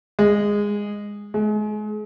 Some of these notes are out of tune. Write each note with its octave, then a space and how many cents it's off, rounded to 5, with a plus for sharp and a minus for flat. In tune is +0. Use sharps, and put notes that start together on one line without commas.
G#3 -15
G#3 +35